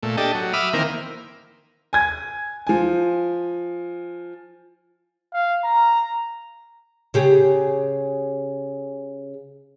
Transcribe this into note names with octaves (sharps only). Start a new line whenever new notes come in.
A#2 A3
D4 G4 A4 D#5
F#3
E5 B5 D6 D#6 F6
D#3 E3 A#3 C4 A#4
G#5 G#6
F3 G#5
F5
A#5
C#3 G4 G#4